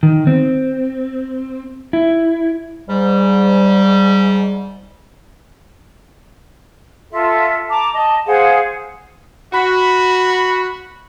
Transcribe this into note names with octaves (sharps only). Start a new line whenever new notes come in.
D#3
C4
E4
G#2 G3
F4 A4 E5
A5 A#5 D6
D#5 A5
G#4 C5 F5 F#5
F#4 B5